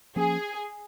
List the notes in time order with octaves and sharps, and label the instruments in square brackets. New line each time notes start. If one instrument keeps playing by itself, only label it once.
[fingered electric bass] F3 A#3 C#4 [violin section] G#4